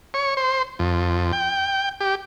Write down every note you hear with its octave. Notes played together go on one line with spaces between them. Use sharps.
C#5
C5
F2
G5
G4